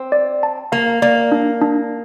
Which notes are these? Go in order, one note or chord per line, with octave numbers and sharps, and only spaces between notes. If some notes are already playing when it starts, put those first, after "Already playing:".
Already playing: C4
D5
A5
A#3 F5
A#3 D5
D4
D4